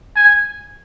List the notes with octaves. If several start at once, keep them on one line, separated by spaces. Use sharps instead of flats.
G#5